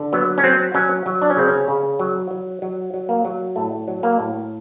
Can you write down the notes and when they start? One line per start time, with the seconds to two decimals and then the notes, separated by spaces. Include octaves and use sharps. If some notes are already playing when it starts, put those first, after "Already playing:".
Already playing: D3
0.13 F#3 B3
0.38 C#4
0.43 F#3 C4
0.74 F#3 C#4
1.06 F#3
1.22 D4
1.30 C#4
1.37 C#3 C4
1.47 C#4
1.68 C#3
2.00 F#3
2.31 F#3
2.62 F#3
2.94 F#3
3.09 A#3
3.25 F#3
3.56 A2 A3
3.88 F#3
4.03 A#3
4.19 A2